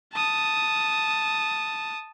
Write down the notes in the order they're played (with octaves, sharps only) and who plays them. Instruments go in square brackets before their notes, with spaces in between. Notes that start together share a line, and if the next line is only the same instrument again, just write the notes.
[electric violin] A5 D#6